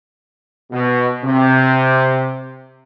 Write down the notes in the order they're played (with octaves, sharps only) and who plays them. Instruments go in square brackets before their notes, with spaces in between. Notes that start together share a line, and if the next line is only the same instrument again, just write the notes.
[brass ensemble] B2
C3